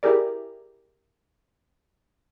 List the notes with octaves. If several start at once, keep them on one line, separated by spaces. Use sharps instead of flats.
E4 G4 G#4 A#4 D5